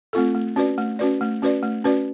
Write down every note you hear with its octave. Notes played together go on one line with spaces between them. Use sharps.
A3 C4 F4 A4
A3
C#4 F#4 B4 D5
A3
C#4 F#4 B4 D5
A3
C#4 F#4 B4 D5
A3
C#4 F#4 B4 D5